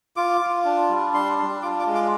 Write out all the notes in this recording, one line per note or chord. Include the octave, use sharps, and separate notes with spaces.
F4 D6
F4
D4
G3
D4 C6
D4
F4 D6
D6
G#3
D6